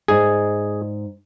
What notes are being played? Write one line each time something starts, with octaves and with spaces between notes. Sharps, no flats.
G#2 G#4 D5 D#5